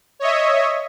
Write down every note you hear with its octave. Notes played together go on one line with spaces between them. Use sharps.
C#5 D#5 E5